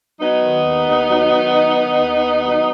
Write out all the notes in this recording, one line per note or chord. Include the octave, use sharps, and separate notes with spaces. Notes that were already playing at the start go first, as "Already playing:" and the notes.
F#3 B3 D#4
D#3
D#2
D#2
F#3
D#3
F#3
D#3
D#2
D#2
F#3